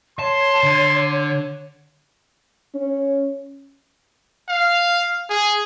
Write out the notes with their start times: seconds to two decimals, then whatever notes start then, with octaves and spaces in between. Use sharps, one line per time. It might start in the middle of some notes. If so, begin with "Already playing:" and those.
0.19 C#5 A5 C6
0.63 D3
2.74 C#4
4.49 F5
5.30 G#4